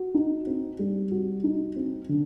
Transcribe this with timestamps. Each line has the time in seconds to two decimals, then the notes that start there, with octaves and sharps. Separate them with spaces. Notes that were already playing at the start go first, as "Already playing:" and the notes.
Already playing: F#4
0.15 D#4
0.47 C4
0.79 G3
1.12 F#4
1.44 D#4
1.76 C4
2.09 D3